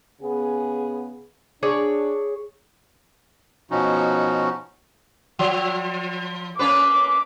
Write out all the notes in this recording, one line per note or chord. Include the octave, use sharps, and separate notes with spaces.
C#3 B3 G#4
D4 G#4 C#5 D5
B2 F3 C#4 D#4 F#4
F3
A#3 C#4 B4 D6